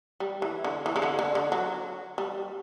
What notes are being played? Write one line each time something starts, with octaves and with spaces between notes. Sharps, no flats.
G3
E3
D3
E3
C#3
D3
D3
D3
F#3
G3